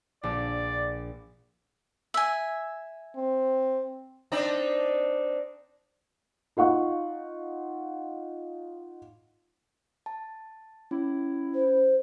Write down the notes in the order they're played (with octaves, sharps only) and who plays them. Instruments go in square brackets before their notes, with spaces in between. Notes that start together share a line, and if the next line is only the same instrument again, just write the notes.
[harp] A#1 [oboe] D5
[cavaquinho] E5 G#5
[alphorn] C4
[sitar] C4 D4 D#4
[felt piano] D#4 F4 F#5 C#6
[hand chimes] A5
[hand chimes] C#4 [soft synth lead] E4
[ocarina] C5